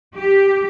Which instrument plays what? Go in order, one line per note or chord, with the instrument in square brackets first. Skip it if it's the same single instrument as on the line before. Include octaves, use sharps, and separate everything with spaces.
[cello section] G4